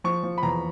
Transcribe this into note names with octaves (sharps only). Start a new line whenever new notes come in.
F3 C#6
F3
B5
E2 A#5